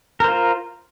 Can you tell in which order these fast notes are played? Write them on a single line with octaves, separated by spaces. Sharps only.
A#4 C5 F4